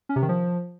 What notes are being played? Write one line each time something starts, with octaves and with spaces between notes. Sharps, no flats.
C#4
C3
D#3
F3